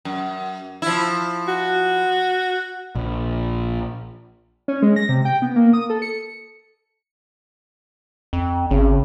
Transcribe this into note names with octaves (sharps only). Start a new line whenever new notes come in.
F#2
F3 E4
F#4
A#1
C#4
G#3
A#6
C3
G5
B3
A#3
D#6
A4
C#7
F2
G#1 C#3